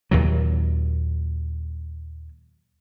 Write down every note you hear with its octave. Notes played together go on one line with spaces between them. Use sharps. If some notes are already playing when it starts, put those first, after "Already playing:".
D#2 A#2 F#3